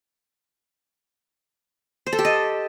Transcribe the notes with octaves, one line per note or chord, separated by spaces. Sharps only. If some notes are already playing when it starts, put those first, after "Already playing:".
C5
A4
G4
D#5